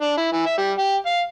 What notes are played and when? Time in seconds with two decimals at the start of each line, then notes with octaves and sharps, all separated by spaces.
0.02 D4
0.17 E4
0.32 E3
0.46 E5
0.58 G3
0.78 G4
1.06 F5